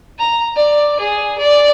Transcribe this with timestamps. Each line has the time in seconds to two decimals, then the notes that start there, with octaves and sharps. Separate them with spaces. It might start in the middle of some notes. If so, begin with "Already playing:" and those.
0.18 A#5
0.56 D5
0.99 G#4
1.38 D5